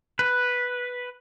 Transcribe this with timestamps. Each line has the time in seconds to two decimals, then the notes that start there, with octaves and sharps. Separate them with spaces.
0.19 B4